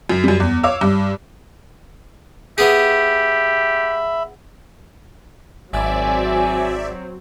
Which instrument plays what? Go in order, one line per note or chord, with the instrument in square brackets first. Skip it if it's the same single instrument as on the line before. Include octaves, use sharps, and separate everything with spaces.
[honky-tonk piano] F#2
F#2 G3
E2
C#5 F5 D6 E6
G2
[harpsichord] B3 G#4 [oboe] G4 [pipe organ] E5 B5
[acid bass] G#1 [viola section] F#3 C4 [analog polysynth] D5 E5 [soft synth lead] G#5